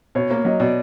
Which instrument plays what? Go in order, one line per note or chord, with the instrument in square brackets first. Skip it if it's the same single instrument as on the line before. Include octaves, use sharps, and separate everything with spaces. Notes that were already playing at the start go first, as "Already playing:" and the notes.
[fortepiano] B2 [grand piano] C#5
[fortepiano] A#3 [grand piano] C#5
[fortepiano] F#3 [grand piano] D#5
[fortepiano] B2 [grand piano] D5